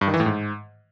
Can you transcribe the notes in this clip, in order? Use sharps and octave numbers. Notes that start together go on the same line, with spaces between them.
G2
D#3
E3
A2
G#2